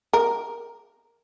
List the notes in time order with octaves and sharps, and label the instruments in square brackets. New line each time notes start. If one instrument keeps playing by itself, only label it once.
[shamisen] A#4